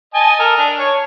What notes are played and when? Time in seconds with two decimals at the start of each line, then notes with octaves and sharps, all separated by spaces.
0.14 D#5 G#5 A5
0.39 A4 A#4
0.58 D4
0.79 C#5